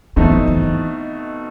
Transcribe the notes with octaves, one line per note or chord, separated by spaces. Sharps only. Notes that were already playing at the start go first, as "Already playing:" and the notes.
B2 E3 A3 C4 D#4
D#3
E3
E3